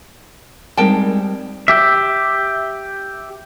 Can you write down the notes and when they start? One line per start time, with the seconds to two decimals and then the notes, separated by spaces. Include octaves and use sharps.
0.77 G3 G#3 C4 D#4 A#4 G5 A5
1.68 G4 E5